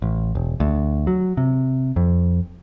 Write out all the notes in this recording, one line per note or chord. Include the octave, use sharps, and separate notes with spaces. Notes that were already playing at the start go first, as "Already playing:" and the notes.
A1
E1
D2
F#3
C3
F2